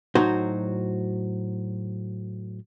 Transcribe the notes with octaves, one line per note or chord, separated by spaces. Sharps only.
A2 F#3 D#4 F#4 C5